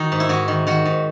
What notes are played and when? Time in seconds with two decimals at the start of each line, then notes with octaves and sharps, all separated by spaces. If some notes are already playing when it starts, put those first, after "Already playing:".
Already playing: D#3 D#4 F#4
0.12 G#2
0.20 E4
0.29 G#2 F#4
0.48 D#3
0.67 D#3 F#4
0.85 G#2